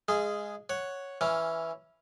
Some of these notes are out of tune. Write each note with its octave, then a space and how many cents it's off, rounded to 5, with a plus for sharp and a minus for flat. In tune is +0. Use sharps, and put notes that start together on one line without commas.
G#3 -5 G#4 +0 F5 -30
C#5 +0 F#5 +0
E3 +0 C#4 +0 F5 +0